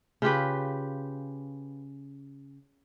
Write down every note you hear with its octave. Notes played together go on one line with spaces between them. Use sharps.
C#3 F4 G4 B4